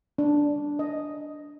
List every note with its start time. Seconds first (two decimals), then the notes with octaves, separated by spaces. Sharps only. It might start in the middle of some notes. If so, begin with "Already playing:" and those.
0.18 D4
0.79 D#5